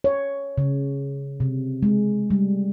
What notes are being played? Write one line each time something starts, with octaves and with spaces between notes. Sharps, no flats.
C#5
C#3
C3
G#3
G3